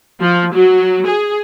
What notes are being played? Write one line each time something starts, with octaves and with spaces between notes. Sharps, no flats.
F3
F#3
G#4